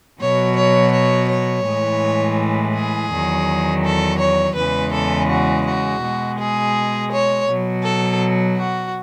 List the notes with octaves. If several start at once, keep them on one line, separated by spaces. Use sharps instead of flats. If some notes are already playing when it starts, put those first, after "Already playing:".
B2 F#3 C#5
C#5
C#5
C#5
A2 E3 G#3
G#4
E2 D#3 F#3
A4
C#5
E2 C#3 E3 G#3 B4
A4
F#4
F#4
B2 G#3
G#4
C#5
B2 F#3
A4
F#4